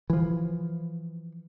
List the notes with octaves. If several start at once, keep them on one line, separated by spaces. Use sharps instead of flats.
E3 F3